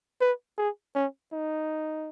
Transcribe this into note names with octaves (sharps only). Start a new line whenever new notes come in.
B4
G#4
C#4
D#4